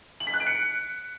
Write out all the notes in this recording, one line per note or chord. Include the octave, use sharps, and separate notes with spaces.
F#7
B6
F#6
D7
C#7